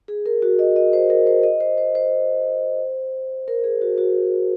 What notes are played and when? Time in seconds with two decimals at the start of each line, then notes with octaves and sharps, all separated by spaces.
0.08 G#4
0.26 A#4
0.42 F#4
0.59 D#5
0.76 D#5
0.93 C5
1.10 A#4
1.27 C5
1.43 D#5
1.61 C5
1.78 C5
1.95 C5
3.48 A#4
3.64 G#4
3.81 F#4
3.98 F#4